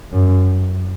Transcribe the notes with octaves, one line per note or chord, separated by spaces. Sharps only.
F#2